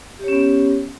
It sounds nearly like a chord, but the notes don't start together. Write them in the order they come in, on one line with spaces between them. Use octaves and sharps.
G4 C#5 C#4 B3